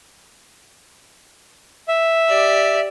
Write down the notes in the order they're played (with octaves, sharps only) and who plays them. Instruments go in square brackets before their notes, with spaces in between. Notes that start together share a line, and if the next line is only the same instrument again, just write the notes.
[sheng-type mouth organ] E5
[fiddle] G4 D5